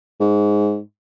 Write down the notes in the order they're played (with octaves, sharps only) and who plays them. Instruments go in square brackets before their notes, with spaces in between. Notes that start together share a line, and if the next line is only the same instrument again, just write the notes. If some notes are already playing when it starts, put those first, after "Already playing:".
[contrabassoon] G#2